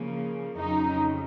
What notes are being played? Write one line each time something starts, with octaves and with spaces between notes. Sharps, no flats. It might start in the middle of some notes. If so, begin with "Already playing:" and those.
Already playing: C#3 F3 A#3
F2 C#3 F#3 C#4 D#4